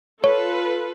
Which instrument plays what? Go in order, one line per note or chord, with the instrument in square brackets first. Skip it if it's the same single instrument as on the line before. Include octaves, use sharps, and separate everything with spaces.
[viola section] F4 A4 B4 [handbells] C#5